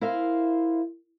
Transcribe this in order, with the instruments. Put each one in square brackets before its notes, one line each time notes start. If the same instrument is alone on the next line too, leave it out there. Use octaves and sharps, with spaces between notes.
[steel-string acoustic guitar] E4 A#4 C5 E5 F5